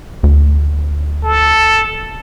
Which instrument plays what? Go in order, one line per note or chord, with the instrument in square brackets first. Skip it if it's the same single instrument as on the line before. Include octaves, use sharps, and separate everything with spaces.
[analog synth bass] D2
[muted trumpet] A4